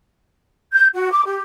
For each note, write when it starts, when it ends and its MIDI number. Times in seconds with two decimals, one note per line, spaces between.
0.73 0.87 91
0.94 1.10 66
1.11 1.25 86
1.25 1.43 67